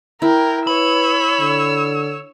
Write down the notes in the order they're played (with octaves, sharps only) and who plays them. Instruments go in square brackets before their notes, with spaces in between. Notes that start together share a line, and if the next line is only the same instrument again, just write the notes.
[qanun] E4 [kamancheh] A#4 G5
[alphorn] B4 [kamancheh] C#5 E6 [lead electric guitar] B5
[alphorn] D3